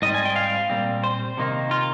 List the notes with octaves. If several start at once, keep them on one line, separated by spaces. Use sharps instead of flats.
G#2 G3 C4 D#5
G#5
G5
F5
A#2 G3 C4
C5
C3 D#3 A#3 D#4
F4